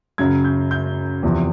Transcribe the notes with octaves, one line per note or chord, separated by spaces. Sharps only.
F#2 C#3 F#3 G#6
G6
G6
E2 C3 F3